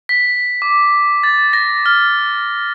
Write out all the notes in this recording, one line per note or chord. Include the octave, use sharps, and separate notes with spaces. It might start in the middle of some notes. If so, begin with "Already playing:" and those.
B6
D6
A6
A#6
F6